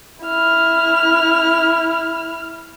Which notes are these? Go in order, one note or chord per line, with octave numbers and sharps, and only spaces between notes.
E4 F6